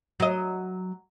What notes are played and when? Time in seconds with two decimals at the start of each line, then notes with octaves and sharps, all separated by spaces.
0.20 F#3 D#5